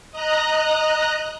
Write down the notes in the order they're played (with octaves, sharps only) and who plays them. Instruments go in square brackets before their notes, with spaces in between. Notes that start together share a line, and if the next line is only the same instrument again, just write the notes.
[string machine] D#5 A#5 F#6